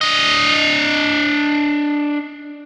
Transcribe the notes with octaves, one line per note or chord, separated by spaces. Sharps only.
D4 D#5